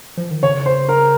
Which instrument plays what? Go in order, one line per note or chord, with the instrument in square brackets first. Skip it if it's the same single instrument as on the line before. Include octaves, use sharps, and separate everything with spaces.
[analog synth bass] F3
D#3
[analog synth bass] C#3 [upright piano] C#5
[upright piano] C5
A#4